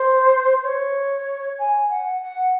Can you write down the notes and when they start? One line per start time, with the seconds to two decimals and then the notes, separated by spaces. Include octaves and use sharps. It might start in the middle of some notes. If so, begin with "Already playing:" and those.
Already playing: C5
0.63 C#5
1.59 G#5
1.89 F#5
2.22 F#5